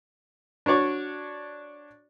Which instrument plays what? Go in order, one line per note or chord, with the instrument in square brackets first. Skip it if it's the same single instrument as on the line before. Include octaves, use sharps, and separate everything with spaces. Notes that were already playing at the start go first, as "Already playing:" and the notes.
[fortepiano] D4 F#4 C#5 D5